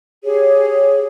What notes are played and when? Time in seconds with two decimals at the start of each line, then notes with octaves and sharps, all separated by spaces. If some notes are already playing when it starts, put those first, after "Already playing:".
0.24 G4 G#4 C#5